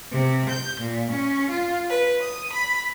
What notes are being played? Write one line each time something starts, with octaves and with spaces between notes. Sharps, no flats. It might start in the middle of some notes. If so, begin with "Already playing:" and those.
C3
G6
A#2
C#4
F4
B4
D#6
B5